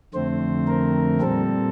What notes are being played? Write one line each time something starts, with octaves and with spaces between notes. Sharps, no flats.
F2 D3 A3 C4 C5
A#4
A#2 G3 C4 A4